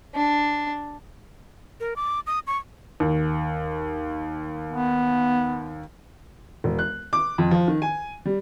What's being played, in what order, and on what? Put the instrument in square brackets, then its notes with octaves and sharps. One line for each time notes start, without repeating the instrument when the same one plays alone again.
[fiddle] D4
[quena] A#4
D6
D#6
C#6
[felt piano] D#2
[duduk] B3
[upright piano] E1
F#6
D6
F2
F3
D#3
G#5
G3